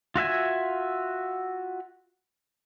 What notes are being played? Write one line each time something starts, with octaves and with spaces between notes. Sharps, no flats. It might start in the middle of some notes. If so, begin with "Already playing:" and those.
F4 F#4 E5 G#5